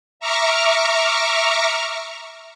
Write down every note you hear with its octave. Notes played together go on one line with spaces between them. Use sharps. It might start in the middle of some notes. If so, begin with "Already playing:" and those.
E5 A#5 C#6 D6 F6